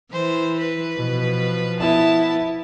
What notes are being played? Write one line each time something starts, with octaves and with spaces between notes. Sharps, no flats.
E3 C5
B4
B2 F3
B3 E4 A5